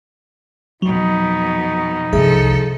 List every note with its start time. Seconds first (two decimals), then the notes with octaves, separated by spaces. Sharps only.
0.82 F2 B2 F#3 D#4
2.13 G1 C2 F3 G#4 A4 E5